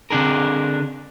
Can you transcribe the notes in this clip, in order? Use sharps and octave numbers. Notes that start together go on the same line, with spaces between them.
D3 C4 D4 G#4 A#4